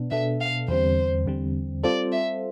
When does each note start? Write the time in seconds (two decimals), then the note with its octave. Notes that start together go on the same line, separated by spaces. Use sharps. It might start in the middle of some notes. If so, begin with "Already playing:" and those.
Already playing: B2 B3 D4
0.11 B2 B3 D4 A4 E5
0.41 F5
0.68 E2 D3 G3 C4 C5
1.26 E2 D3 G3 C4
1.83 G3 C4 F4 A4 C5 D5
2.12 E5